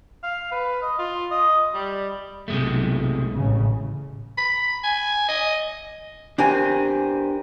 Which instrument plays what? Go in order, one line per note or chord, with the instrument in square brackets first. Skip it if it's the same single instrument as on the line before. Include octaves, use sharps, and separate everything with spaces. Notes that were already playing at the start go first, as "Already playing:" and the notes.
[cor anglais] F5
B4
D#5
F4
D#5
G3
[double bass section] B1 [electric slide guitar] C3 G#3 A3
[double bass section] A1 A2 C#3
[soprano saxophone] B5
G#5
D#5
[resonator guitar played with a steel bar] E2 C4 G#5 [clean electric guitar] D4 G4 A#4